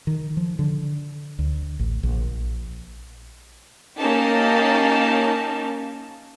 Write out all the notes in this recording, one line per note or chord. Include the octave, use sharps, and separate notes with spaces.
D#3
F3
D3
D2
A1
A#1
A#3 C#4 D#4 G4 A5